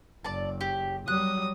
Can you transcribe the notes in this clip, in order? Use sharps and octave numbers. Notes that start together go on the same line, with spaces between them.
F#1 D5 A5
G4
F#3 G3 D#6 F#6